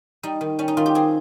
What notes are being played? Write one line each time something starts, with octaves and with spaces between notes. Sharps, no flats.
G3 D#4
D#3
G3 C#4
D#4
D#3 F4
G4
C4 G#4